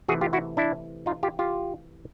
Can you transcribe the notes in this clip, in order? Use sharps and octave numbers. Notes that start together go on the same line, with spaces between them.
C3 E3 A3 F#4 G#4
F4 G4
E4 F#4
D4 E4
D#4 F4
F4 G4
F4 G4